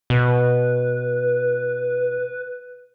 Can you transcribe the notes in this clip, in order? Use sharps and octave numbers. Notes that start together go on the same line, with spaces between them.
B2 B4